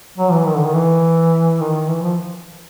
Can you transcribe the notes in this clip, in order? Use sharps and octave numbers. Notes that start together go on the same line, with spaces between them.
F#3
E3
D#3
D3
D#3
E3
D#3
E3
F3